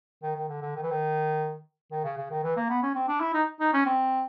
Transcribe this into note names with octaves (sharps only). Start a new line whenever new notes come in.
D#3
D#3
D3
D3
D#3
E3
D#3
D#3
C#3
C#3
D#3
E3
A#3
B3
C#4
C4
D4
E4
D#4
D#4
C#4
C4